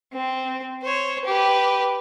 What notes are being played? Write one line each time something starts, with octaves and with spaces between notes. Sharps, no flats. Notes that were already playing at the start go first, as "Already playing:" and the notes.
C4
C5 C#5
G4 B4